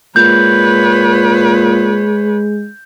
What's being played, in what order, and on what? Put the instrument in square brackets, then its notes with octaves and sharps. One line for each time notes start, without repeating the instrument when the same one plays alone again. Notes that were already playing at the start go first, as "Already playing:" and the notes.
[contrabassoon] A#2 [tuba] G#3 [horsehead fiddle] B4 C#5 [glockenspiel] G6